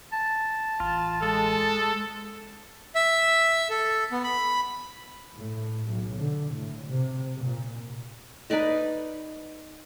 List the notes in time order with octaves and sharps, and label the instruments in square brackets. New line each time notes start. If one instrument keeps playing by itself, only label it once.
[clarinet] A5
[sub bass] A1 [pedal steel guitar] F4
[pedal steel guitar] G#3 [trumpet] A4
[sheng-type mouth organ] E5
A4
B3
B5
[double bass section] A2
B1
D3
A2
C3
A#2
[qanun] D#4 B4 D5 D#5